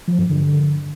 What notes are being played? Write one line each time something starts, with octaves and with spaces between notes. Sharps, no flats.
F3
G2
D3